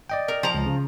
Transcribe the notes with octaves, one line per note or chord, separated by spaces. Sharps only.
D5 D#5 G5
A#4
F3 A#5
C#2
C#3